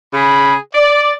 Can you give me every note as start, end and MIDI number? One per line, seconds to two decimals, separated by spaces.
0.14 0.55 49
0.14 0.55 68
0.14 0.55 83
0.75 1.11 74